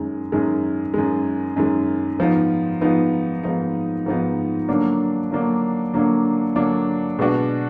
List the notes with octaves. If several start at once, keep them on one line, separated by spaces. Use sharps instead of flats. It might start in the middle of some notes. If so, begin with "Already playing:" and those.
Already playing: F#2 D#3 G#3
F#2 D#3 G#3
F#2 D#3 G#3
F#2 D#3 G#3
G#2 F3 B3 D#4
G#2 F3 B3 D#4
G#2 F3 B3 D#4
G#2 F3 B3 D#4
D3 F#3 A#3 D4
D3 F#3 A#3 D4
D3 F#3 A#3 D4
D3 F#3 A#3 D4
B2 G#3 D4 F#4